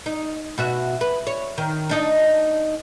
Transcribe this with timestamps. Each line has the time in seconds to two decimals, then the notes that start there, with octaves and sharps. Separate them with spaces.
0.06 D#4
0.58 B2 F#4 E5
1.01 B4
1.27 C#5
1.58 D#3
1.89 D4 D#4 D#5